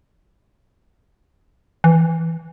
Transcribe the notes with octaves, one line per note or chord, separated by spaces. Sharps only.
E3